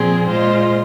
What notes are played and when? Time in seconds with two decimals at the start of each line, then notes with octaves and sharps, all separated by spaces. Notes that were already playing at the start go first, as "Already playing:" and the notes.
Already playing: A#2 F3 C4 G#4
0.28 A#2 G#3 F4 C5 D#5